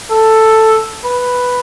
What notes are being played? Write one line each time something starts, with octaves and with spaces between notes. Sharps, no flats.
A4
B4